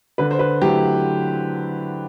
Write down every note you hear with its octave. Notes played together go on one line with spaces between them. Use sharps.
D3 B4
C5
B4
F#3 A3 E4 G4